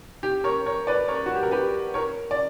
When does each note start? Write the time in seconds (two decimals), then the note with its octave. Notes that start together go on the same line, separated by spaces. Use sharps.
0.23 G4
0.44 A#4 C#5
0.66 A#4 C#5
0.87 B4 D5
1.08 A#4 C#5
1.26 F#4
1.35 G4
1.43 A#4
1.51 G4 B4
1.94 A#4 C#5
2.31 D5